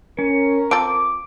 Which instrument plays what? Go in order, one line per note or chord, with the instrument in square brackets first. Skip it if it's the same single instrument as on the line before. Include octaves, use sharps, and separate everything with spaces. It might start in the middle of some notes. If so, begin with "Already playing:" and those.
[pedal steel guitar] C#4 [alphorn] A#4
[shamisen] C4 F4 A4 [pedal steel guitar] D6 [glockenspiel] D7